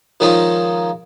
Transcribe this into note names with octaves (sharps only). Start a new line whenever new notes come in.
D#3 F3 G#3 C#4 D#4 F4